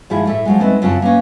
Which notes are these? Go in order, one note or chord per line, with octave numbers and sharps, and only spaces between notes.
G#2 D#3 F3 E4 F4 G#4
A2 A4 E5
F3 F#3 G#3
G#3 A3 B3 C4 D#4
F#2 C#3 C4 F4 F#5 A5
A#3 B3 C#4